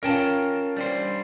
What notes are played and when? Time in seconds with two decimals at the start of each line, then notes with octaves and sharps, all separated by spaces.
0.03 C#4 F4 A#4 G5 A5
0.77 G3 D4 C5